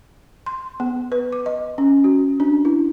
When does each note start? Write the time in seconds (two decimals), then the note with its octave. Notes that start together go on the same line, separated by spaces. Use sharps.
0.46 C6
0.80 B3
1.12 B4
1.33 D6
1.46 D#5
1.78 C#4
2.04 F#4
2.40 D4
2.65 E4